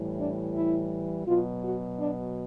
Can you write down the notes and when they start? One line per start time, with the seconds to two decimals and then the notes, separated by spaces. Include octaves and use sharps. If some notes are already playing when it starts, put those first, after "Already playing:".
Already playing: A2 E3 G3
0.19 D4
0.55 E4
1.27 B2 F#3 F4
1.63 F#4
1.99 D4